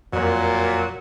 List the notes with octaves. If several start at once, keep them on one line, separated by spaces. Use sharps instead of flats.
F2 A#2 F#3 A#4